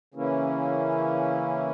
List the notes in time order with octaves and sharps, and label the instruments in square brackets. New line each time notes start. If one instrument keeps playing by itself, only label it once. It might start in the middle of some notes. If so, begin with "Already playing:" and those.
[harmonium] C#3 E3 A#3 C#4 E4